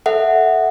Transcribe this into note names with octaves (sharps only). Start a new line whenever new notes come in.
A4 E5 F#5